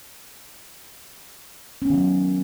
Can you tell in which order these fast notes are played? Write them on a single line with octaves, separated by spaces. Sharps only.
C#4 B3 D#3 F#3